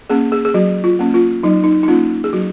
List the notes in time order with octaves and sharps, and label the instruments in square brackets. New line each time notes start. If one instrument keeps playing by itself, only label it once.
[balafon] A#3 C#4 G#4
G#4
G#4
F#3 F#4
F4
A#3 C#4
F4
F#3 D#4
D#4
D#4
A#3 C#4 F4
G#4
F#3 F#4